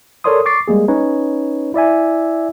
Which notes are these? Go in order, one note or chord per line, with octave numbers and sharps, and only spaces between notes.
A4 A#4 C#5 D5 C6 D#6
C#6 D6 A6 C7
G3 G#3 A#3 G#4
C#4 D#4 B4 C#5
E4 D5 E5 G#5